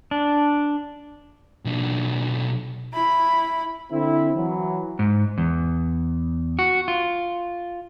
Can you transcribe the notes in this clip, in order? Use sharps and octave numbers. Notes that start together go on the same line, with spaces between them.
D4
B1 D4
E4 B5
D3 C4 E4
E3 F#3
G#2
E2
F#4
F4